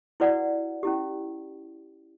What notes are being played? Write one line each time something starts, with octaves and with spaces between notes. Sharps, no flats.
E4 F#4 B4 D5 F#5
C#4 E4 G4